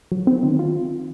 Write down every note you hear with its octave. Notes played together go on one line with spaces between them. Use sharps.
F#3
C4
D#3
F4